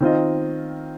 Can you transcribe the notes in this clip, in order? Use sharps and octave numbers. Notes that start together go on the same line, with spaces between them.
D#3 C4 F4 D#5